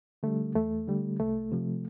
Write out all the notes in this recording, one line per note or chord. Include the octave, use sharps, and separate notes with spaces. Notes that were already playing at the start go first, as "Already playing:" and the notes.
D3 G3 A3
E2 A3
D3 G3
C2 A3
C3 F3